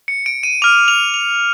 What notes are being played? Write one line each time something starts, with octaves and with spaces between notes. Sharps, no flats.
C#7
D7
D#7
D6 F6 F7
F7
F7